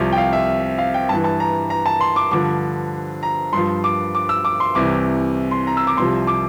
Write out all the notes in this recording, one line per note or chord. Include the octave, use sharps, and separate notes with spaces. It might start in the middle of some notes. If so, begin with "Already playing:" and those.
Already playing: C2 C3 F3
G5
F5
E5
F5
G5
G2 E3 A5
A5
A#5
A#5
A5
C6
D6
G2 D3 F3 D6
A#5
G2 F3 C6
D6
D6
E6
D6
C6
C2 C3 E3 D6
C6
A#5
E6
D6
C2 C3 F3 C6
D6